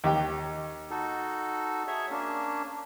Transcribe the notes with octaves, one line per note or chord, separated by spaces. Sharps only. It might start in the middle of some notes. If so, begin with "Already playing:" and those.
D#2 G4 G5
D#4 F#4 A4
G#4 C#5 E5
A#3 C#4 D4